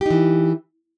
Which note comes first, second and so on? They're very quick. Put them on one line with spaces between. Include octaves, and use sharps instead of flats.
G4 D#4 E3